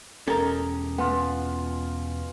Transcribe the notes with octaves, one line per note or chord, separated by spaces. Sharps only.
E1 C#4 G4 A4 A#4 D#5
B2 B3 F4 G#5